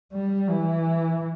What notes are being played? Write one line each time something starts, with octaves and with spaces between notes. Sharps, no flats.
G3
E3